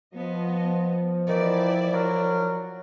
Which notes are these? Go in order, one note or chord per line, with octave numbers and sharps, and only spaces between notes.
F3 B3 D#5
D#3 E3 E4 D5
F#3 A#4